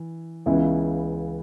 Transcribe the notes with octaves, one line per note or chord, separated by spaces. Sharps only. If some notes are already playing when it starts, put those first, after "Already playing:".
Already playing: E3
C#2 C#3 E3 B3 E4